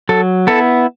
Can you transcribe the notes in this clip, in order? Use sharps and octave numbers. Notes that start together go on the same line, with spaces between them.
F#3 A4
B3 E4 A4